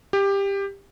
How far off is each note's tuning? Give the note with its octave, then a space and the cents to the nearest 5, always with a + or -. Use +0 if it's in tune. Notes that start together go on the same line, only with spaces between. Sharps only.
G4 +15